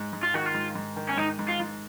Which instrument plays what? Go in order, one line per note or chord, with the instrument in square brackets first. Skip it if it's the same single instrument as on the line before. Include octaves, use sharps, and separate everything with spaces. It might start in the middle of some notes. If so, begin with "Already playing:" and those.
Already playing: [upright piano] G#2
G#2
[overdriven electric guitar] F4
[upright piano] D#3 [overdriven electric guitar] F#4
[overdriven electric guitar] F4
[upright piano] G#2
G#2
D#3
[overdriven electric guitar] C#4
[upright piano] G#2 [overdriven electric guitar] D#4
[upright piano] G#2
[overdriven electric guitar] F4
[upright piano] G#2